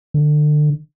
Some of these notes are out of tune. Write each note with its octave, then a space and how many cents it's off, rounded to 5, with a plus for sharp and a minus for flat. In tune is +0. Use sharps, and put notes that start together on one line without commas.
D3 +30